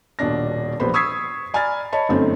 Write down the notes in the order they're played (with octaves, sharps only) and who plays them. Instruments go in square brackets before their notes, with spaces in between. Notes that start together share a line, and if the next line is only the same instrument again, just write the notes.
[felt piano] D#1 B2 D4 A#6
E1 A#1 B4 C5 B5
C#6 D#6 E6 G#6 B6 C7
D5 G#5 A#5 B5 F6 A6
C#5 D#5 A5 B5
G1 F#2 A3 C4 D#4